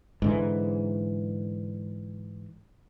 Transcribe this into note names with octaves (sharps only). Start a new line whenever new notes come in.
G#2 D3 E3